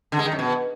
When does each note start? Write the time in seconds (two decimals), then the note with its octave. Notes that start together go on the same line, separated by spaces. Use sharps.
0.12 D3
0.19 G#3
0.25 D#3
0.32 F#2
0.39 B2